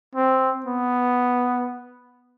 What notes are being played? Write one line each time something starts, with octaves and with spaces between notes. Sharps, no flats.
C4
B3